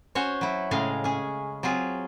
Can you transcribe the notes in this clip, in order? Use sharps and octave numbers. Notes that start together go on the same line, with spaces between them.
C#4 F#4 C5 C#5
F#3 E4
A2 C#3 G#3 G#4 F5
C#4 G#4
F#3 C4 F4 G#4